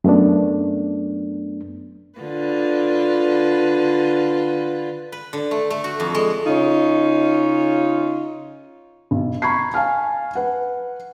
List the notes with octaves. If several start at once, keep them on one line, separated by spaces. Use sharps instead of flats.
F#2 A3 B3 D4
D3 F4 B4
B4
D3
A3
A3
F#4
F2
G#3
C#3 C#4 D#4 F4
B1
A#5 B5 C#6 G#6 C7
F5 G#5 A5 F6
B4 F#5